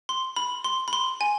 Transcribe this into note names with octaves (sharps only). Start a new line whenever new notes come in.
C6
B5
C6
B5
C6
G#5